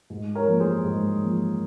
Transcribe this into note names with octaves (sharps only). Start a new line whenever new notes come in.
G#2
A#4 C#5
F3 A#3
G#4 C5
G#2
F3 A#3